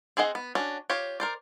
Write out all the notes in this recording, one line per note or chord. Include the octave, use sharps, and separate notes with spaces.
C4 G#4 C5 D#5 F#5
B3
C#4 D4 F#4
F4 G4 C5 C#5
A#4 C5 D5